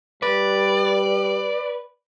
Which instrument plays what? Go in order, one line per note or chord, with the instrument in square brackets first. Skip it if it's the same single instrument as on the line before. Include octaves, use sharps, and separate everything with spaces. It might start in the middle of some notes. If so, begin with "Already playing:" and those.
[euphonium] G3 [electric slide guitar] B4 [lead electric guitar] D5